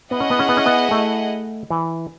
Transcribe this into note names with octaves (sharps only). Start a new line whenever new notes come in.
B3 E4 G#4 D#5 F#5
C#4
B3
C#4
B3
C#4
B3
A3
E3